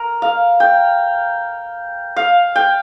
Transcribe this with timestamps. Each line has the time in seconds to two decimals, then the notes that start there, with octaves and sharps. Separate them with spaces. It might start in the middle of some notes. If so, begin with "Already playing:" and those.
Already playing: A#4
0.22 F5
0.60 G5
2.16 F5
2.56 G5